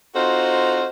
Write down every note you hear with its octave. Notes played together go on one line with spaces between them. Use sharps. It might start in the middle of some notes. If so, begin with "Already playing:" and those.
C4 D#4 F4 F#4 A4 C5